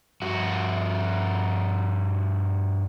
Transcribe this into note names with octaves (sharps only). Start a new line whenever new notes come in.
G2 F#4